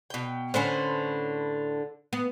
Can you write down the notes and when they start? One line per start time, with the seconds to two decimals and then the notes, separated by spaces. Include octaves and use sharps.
0.10 B2 G5
0.54 A2 D3 C#4 B4 C5
2.13 B3